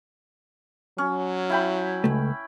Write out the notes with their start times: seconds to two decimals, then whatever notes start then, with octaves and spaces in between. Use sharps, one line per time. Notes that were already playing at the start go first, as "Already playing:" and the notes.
0.98 F#3 C#4
1.50 E4 G5 B5
2.04 C#2 A3